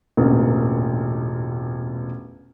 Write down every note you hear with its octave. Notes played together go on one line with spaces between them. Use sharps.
E1 A1 A#2 D3 A#4